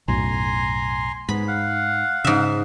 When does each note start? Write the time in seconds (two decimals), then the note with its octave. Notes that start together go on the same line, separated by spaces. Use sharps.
0.08 B1 F#2 A2 G#5 A#5 C6
1.29 G#2 B3 B5
1.48 F5 F#5
2.24 G#2 C#3 E5